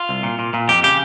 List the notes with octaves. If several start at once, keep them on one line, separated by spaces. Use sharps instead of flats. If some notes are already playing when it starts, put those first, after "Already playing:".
Already playing: F4
C2
A#2
A#2
A#2
F2 G4
C#3 G4